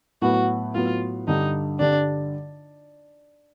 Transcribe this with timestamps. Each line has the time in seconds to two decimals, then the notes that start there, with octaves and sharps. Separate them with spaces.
0.22 A2 F#3 B3 F#4
0.75 A2 F#3 B3 F4
1.27 G2 D3 G3 D#4
1.80 G2 D3 G3 D4